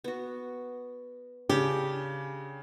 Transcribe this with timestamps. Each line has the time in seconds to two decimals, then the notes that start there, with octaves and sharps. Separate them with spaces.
0.04 B3 F#4
1.49 C#3 D4 G4